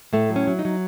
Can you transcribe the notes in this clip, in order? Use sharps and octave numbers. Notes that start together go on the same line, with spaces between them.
A2 A3
F#3
C#4
F#3
D#4
F#3